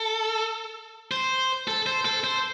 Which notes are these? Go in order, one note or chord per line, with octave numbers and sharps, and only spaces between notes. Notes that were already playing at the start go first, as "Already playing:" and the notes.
Already playing: A4
C5
A4
C5
A4
C5